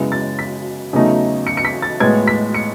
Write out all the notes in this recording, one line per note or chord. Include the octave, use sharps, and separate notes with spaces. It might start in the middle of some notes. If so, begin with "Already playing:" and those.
Already playing: F#2 C#3 G#3 B3 E4
A6
B6
E2 C#3 F#3 A3 D#4
C#7
C#7
B6
A6
A2 G#3 B3 G#6
B6
C#7